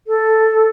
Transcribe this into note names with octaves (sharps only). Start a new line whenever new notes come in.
A4